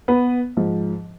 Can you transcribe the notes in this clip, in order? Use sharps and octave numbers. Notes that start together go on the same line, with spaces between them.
B3 B4
G#2 F3